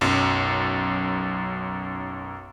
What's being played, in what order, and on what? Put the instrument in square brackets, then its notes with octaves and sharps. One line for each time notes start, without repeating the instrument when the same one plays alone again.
[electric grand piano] B1 F#2